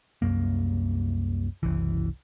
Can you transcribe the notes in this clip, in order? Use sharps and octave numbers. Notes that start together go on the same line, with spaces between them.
C2 F#2 A#3
F#1 C2 E3